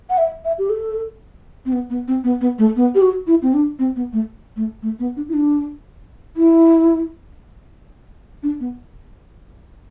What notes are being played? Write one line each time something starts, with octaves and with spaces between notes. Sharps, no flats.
F#5
E5
E5
G4
A4
C4
B3
B3
C4
B3
B3
A3
B3
G4
F#4
E4
C4
D4
C4
B3
A3
A3
A3
B3
D4
E4
D4
E4
D4
B3